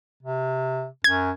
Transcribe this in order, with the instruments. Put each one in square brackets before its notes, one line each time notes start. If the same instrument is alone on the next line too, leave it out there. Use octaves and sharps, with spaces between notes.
[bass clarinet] C3
[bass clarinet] F#2 [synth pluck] G#6